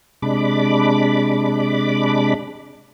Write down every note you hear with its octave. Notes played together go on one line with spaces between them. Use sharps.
C3 G#3 D4 B5 D6